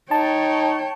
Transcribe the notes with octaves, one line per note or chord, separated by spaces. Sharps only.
D#4 C#5 G5 A5